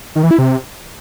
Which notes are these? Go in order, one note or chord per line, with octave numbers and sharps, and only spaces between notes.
D#3
E3
E4
C3